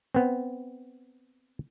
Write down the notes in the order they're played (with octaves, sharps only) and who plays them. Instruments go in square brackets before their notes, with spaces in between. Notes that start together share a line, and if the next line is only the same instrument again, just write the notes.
[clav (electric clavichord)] B3 C4